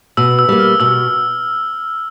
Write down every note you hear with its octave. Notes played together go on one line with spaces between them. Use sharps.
B2 E6
E6
G3 A#3
F6
B2 E6